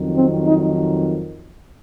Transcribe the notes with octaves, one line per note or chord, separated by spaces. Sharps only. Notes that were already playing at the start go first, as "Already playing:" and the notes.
Already playing: F2 D#3 F#3
C4
D#4